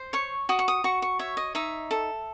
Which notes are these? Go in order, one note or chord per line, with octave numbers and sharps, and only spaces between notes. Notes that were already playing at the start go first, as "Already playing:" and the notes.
Already playing: C5
C#5 C#6
F#4 D#6
C#6
D#6
F#4 C#6
C#6
C#5 E5
D#5
D#4 E5
A4